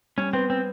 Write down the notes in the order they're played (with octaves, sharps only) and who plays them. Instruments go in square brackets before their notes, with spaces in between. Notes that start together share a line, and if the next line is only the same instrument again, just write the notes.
[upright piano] G3 [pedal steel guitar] C#4
[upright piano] B3 [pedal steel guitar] C4
[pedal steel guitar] C4